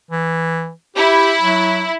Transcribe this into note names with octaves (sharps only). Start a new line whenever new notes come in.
E3
E4 G4
F#3